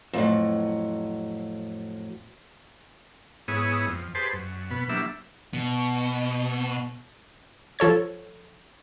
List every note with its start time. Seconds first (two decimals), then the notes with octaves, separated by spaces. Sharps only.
0.13 F2 A2 F#3
3.48 G#2 B3 E4 G#4 C#5 D#6
3.87 F2
4.15 G4 G#4 B4 C5 A5 C6
4.33 F#2
4.71 B2 B3
4.89 F#3 A#3 D4 E4 G4 E5
5.54 B2
7.79 F3 A4 C#5 G#6